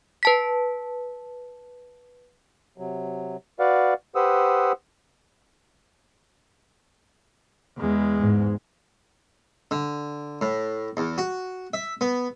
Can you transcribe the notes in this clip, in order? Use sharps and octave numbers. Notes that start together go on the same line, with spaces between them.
B4 A5 B6
C3 F#3
F#4 B4 D5 F5 F#5
G4 B4 C5 F#5 D#6 E6
E2 G#3
G#2
D3
A2
E2
F#4
E5
B3